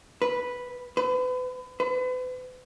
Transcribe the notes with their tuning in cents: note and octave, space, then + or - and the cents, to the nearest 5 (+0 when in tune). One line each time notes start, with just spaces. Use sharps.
B4 -5
B4 +35
B4 +40